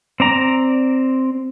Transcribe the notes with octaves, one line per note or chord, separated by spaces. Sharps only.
C4 D5 A#5